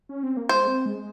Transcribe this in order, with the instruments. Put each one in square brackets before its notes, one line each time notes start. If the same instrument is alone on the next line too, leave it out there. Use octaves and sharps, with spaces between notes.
[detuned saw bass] C#4
C4
A#3
[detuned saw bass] G#3 [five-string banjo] C5
[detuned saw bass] C4
G#3